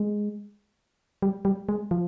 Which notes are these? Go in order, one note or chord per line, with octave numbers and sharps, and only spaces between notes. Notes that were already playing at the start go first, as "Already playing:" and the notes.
Already playing: G#3
G3
G3
G#3
F3